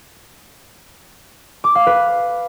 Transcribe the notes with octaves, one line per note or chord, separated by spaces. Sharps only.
D6
F5
B4